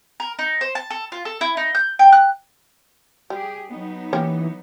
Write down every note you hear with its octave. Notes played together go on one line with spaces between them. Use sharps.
A#4
D#4
C5
A5
A4
F4
A4
E4
D#4
G6
G5
F#6
G3 G4 G#4
F#3 B3 D#4
E3 A#3 C#4 G4